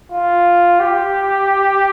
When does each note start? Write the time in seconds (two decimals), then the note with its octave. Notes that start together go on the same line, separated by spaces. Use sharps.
0.11 F4
0.80 G4